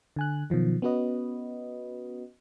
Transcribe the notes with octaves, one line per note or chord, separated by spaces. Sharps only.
D3 G#5 F#6
B2 D#3 F3 F#3
B3 C#4 F#4 B4 D#5